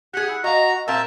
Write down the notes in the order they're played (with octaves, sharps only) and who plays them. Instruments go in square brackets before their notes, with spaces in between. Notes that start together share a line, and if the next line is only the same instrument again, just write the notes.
[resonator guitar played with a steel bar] G4 G#4 [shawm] F#5
[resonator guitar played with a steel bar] E4
[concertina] F#4 [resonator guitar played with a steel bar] D#5 F5 [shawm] A#5
[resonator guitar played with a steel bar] A#2 C4 F5 [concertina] A#4 E5 E6 [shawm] A5